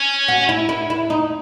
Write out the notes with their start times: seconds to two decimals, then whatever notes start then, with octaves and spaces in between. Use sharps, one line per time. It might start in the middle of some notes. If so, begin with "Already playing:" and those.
Already playing: C#4
0.28 F#4
0.49 E4
0.69 E4
0.90 E4
1.10 D#4